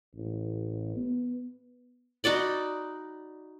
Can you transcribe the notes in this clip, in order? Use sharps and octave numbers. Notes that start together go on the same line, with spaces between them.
A1
B3
D#4 F#4 D5 B5